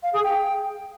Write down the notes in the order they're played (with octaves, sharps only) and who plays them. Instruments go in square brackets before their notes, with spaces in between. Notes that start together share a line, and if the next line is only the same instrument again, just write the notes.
[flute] F5
G#4
G5